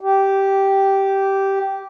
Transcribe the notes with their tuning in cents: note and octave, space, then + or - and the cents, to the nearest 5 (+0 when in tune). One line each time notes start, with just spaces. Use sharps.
G4 -10